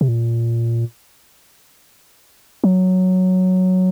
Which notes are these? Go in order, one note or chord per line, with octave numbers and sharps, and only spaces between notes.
C3
A#2
F#3